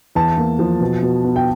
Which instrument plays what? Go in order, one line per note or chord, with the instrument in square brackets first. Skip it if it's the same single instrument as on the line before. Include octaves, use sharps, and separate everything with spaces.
[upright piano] E2 A5
A#3
F3
B2
B2
B3
G5